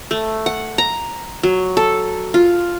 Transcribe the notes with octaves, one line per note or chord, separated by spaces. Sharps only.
A3
F#5
A#5
F#3
A4
F4